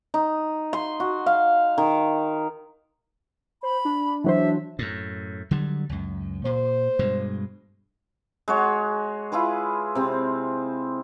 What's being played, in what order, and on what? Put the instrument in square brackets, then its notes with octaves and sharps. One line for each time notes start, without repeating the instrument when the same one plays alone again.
[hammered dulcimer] D#4
C6
F#4
F5
D#3
[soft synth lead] C5 [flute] B5
[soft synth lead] D4
[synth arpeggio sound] E3 F#3 C5 [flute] E5
[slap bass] F#2 A2
D3 F#3 G3
C#2 F#2
[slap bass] A#2 [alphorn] C5
[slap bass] G2 B2 G#3
[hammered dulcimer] G#3 F#4 C#5
E4 F4 G#4 B4
C3 C4